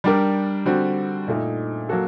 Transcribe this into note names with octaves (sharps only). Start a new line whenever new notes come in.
G3 D4 G4 A#4
D3 G3 C4 F#4
A#2 A3 D#4
F#3 A#3 F#4 A4